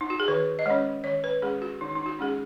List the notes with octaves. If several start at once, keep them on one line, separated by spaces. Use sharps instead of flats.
D#4
F#4
G#4
D#3 B4
D#5
G#3 C#4 C#5
D#3 C#5
B4
G#3 C#4 G#4
F#4
D#3 D#4
D#4
F#4
G#3 C#4 G#4